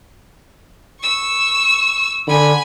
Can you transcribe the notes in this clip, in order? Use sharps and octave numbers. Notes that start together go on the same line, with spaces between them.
C#6 E6
D3 G#5 B5